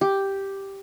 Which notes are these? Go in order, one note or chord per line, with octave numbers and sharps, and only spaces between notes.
G4